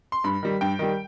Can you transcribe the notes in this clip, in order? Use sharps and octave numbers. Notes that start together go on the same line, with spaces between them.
C6
G2 B5
D#3 G3
G2 G5
D#3 G3